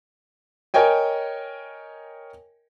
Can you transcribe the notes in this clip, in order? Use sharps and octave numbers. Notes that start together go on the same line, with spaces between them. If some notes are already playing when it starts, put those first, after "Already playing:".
A#4 C#5 D#5 G5 G#5